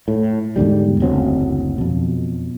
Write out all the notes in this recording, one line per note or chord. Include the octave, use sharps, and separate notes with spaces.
A2
E2 G#2 D3 G3
F#1 D2 F#3 C4
F2 B2